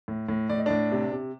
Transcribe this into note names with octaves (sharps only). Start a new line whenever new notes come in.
A2
A2
A2 D5
D#5
A2 D4 D5
C3
C3